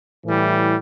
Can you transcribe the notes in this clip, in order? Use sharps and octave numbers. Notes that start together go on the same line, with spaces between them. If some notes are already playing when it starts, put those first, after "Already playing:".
A2 E3 G3